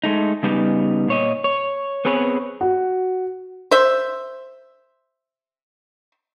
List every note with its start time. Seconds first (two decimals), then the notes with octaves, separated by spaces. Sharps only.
0.04 G#3 A3 D#4
0.43 C#3 G3 B3 D#4
1.08 A#2 C#5 D#5
1.44 C#5
2.05 B3 C4 G#4 B4 C#5
2.61 F#4
3.71 C5 E5